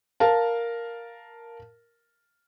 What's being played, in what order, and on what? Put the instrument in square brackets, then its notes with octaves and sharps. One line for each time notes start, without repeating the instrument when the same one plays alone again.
[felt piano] A#4 F5 A5